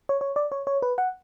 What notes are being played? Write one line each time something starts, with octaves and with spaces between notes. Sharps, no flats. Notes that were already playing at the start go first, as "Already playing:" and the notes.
C#5
C#5
D5
C#5
C#5
B4
F#5